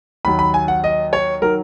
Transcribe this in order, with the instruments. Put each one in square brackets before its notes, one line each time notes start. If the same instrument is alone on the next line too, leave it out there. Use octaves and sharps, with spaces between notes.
[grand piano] D#2 D#3 F#3 B5
B5
G#5
F#5
D#5
C#5
D#3 F#3 A#4